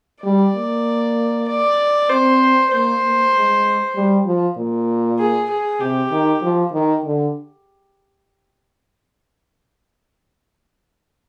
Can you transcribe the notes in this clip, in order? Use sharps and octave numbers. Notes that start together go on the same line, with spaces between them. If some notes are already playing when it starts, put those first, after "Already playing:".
G3 D5
A#3
D5
C4 C5
A#3 C5
A#3
G#3
G3
F3
A#2
G#4
G#4
C3 G4
D#3
F3
D#3
D3